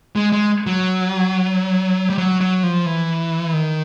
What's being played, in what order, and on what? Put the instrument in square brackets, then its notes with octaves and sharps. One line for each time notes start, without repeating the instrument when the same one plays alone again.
[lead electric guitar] G#3
G#3
F#3
G3
F#3
F#3
F3
E3
D#3